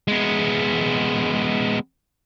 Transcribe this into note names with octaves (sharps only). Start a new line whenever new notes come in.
G#3 B3